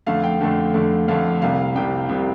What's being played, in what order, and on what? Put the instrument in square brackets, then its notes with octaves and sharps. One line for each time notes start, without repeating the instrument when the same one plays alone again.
[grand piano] F2 D3 A3 F5
G5
F2 D3 A3
F2 D3 A3
F2 D3 A3 F5
C2 C3 G3 F5
C2 C3 G3 G5
C2 C3 G3